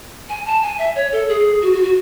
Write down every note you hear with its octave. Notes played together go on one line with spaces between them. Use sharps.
G#5
A5
G#5
E5
C#5
A4
G#4
F#4
F#4
F#4